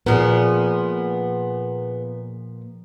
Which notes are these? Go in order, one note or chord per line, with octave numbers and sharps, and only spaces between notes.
A#2 F3 B3 G#4